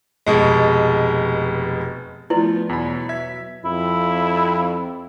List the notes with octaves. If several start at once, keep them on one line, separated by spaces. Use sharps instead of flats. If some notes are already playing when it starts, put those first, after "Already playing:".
F1 B2 G#3
F3 A3 B3 E4 F4 B4 D5
E2 B2 F#3 B5
E5 G#6 B6
F2 E4